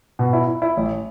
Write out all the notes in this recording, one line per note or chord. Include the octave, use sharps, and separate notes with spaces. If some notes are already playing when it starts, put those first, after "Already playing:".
B2
E4
E4
E4
A1